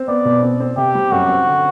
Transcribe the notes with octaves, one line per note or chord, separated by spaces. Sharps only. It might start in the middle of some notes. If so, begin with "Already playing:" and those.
Already playing: C4
B3 D5
B2
C4
C4
C3 G4
G3
F#2 F#4
C4
D3